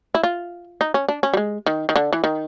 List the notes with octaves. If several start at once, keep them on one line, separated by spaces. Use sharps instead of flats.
E4
F4
D#4
C#4
D4
C#4
G3
G#3
D#3
D#3
D3
E3
D#3